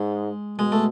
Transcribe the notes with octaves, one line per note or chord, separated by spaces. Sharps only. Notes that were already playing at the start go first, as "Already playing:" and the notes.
Already playing: G#2 G#3
B2 G#3
A3